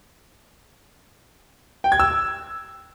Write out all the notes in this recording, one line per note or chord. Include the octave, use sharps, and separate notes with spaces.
G5
G#6
E6